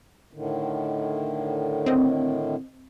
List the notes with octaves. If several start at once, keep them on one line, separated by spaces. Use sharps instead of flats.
A2 D3 D#3
C4 D#5